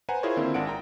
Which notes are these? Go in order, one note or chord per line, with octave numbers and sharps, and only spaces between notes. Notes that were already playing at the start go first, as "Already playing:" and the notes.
B4 C5 F#5 G#5 A#5
E4 F4 G#4 A#4 C5 C#5
D3 D#3 A#3 C4 E4 F4
G#1 D4 F#5 D7
G5 A#5